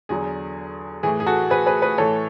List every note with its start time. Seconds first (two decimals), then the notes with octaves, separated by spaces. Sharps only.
0.09 E2 D3 F#3 G#4
1.03 A2 E3 G#4
1.20 G#4
1.26 F#4 A4
1.50 G#4 B4
1.66 G#4 B4
1.82 G#4 B4
1.98 A2 E3 A4 C#5